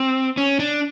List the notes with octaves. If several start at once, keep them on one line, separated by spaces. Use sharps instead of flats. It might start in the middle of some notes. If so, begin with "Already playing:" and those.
Already playing: C4
C#4
D4